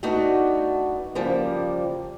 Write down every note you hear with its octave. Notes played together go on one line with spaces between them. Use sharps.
A3 B3 D4 D#4 F#4
C#3 F3 G3 A#3